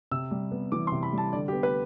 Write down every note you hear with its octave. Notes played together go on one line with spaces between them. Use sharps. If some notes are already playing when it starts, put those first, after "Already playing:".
C3 E6
G3
B3
E3 D6
C6
C3
B5
G3 A5
D3 D5
G4
B3
B4